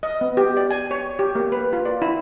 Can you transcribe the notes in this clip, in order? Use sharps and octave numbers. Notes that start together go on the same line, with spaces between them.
D#5
B3
G4
D5
G#5
C#5
G4
A#3
B4
F4
D5
E4